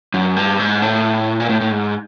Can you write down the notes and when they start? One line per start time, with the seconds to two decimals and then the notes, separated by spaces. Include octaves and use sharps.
0.14 F#2
0.36 G2
0.59 G#2
0.82 A2
1.40 A#2
1.49 A2
1.61 A2
1.72 G#2